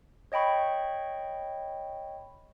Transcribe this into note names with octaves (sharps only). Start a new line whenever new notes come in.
C#5 D#5 G5 B5 C#6